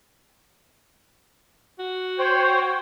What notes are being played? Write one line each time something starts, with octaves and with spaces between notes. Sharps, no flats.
F#4
C5 C#5 G5